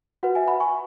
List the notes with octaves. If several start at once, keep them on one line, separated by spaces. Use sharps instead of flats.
F#4 B4 F#5
E5 G#5
F#5 B5
G#5 C#6